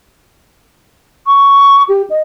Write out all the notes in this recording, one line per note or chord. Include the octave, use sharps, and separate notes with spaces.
C#6
G4
D#5